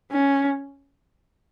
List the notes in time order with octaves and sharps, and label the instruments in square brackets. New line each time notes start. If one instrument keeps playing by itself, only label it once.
[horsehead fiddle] C#4